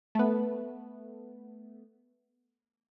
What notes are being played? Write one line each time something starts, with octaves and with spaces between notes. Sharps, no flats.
A3 B3